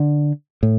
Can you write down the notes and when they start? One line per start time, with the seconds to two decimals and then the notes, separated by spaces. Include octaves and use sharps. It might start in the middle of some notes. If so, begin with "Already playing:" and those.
Already playing: D3
0.63 A2